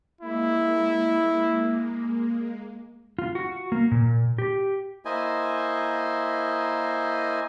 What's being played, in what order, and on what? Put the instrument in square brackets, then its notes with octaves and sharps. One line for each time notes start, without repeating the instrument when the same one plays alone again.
[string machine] G#3 A#3 [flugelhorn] E4
[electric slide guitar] F4
F#4
A#3
A#2
G4
[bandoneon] A#3 E4 C5 D#5 G#5